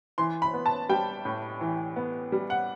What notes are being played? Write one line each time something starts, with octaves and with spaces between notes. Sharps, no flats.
E3 C6
B5
B3
A5
G3 G5
A2
E3
B3
G3
F#5